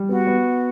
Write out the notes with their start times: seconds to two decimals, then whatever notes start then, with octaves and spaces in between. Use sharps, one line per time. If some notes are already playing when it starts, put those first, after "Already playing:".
Already playing: G3
0.09 B3 F#4
0.27 B3